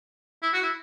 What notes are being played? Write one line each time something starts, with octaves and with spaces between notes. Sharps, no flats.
E4
F#4
E4